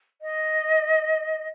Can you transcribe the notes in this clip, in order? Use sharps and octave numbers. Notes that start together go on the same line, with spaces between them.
D#5